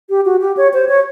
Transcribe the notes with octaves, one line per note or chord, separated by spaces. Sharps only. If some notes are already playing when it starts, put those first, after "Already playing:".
G4
F#4
G4
C#5
C5
C#5